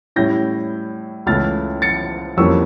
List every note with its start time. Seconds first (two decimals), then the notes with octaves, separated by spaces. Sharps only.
0.16 A2 G3 C#4 E4 G6 A#6
1.26 C#2 C#3 E3 A3 E4 F6 A6
1.82 A6 C#7
2.37 F2 E3 G3 A#3 C#4 C#6 E6